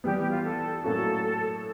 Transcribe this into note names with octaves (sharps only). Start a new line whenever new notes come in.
E3 G3 B3 G4
G4
F4
A4
A2 F#3 A#3 C#4 F#4 A4